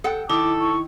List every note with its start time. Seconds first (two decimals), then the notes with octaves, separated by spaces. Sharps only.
0.04 A4 F#5 G5
0.29 D#3 E4 A4 D6
0.61 C#6